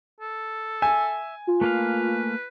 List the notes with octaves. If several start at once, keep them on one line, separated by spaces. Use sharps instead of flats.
A4
E5 G#5
F4
A3 A#3 B4 F5